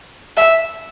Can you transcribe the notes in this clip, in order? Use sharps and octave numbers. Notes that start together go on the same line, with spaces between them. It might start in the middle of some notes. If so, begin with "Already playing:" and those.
E5